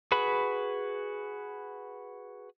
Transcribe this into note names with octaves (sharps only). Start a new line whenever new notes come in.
F#4 G#4 B4 B5